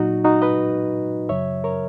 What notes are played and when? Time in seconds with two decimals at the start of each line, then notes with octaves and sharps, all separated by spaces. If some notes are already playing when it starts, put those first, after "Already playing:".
Already playing: A#2 F#3 D#4 F#4
0.24 D#4 F#4
0.42 B4 D#5
1.29 F#2 C#3 F#3 C#5 E5
1.64 A#4 C#5